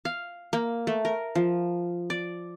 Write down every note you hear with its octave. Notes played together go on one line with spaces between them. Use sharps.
F5
A#3
A3
A#4
F3
D5